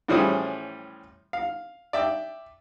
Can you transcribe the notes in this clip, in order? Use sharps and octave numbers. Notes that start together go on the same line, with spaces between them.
A2 E3 F3 G3 C#4 G#4
F5
D5 E5 G5